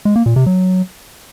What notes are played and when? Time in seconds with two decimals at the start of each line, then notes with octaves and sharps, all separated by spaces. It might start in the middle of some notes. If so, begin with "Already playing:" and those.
0.05 G#3
0.16 A#3
0.26 A#2
0.36 C3
0.46 F#3